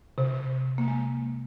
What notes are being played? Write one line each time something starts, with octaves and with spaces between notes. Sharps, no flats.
C3
A#3
G#3